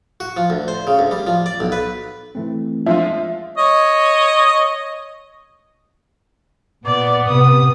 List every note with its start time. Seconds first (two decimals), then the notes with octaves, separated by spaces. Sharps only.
0.20 F#4
0.37 F3
0.50 D2
0.68 C5
0.87 C#3
0.99 D2
1.11 G3
1.27 F3
1.46 D5
1.60 B1
1.72 B4
2.35 E3 A3 C4
2.86 F3 G#3 D4 F4 E5
3.58 C#5 D#5
6.86 A#2 B3 D5
7.27 C3 D#6